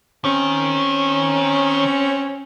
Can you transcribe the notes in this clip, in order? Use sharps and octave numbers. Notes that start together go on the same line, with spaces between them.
D#3 C4 C#4